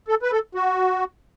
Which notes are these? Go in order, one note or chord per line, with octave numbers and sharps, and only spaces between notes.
A4
B4
A4
F#4